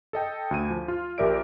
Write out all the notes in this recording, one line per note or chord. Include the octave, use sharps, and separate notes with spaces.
A4 D#5 G5
D2 G#5 D#7
F3
F4
A#1 G4 A#4 D5 E5 D7